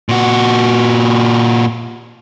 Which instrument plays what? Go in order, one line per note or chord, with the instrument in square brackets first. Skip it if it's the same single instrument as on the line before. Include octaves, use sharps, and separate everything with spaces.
[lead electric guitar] A#2 F#4